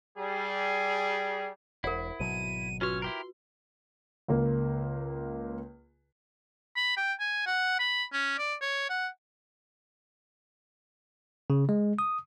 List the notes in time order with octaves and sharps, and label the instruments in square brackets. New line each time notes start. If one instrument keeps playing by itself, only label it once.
[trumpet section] G3 G#4
[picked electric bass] E1 [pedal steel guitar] E4 [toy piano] A#4 C5 F#5
[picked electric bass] G#1 B2 F#3 [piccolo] D#7
[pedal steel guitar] C#4 C#5 [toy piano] F4 F#4 B4 [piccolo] F6
[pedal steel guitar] E4 G4 A#4 [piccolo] C6
[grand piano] C#2 A#3
[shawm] B5
G5
G#5
F#5
B5
C#4
D5
C#5
F#5
[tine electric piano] C#3
G#3
D#6